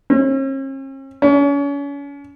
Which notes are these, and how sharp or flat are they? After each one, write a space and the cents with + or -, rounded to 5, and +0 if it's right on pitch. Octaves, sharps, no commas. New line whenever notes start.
C#4 -45
C#4 +35